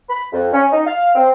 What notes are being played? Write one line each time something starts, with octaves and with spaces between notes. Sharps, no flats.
B5
F2
C#4
D#4
F5
C4